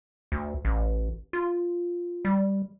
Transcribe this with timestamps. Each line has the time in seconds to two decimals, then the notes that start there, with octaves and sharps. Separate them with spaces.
0.32 D2
0.65 A1
1.33 F4
2.25 G3